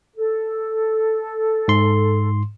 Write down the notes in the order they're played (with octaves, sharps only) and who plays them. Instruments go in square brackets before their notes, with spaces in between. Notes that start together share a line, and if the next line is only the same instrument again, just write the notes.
[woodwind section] A4
[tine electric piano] G#2 C6